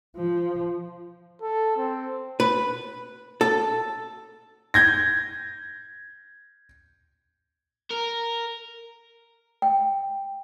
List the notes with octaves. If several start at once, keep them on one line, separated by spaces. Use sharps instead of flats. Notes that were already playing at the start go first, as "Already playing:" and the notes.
F3
A4
C4
B4
A4
G6 G#6 A#6
A#4
G5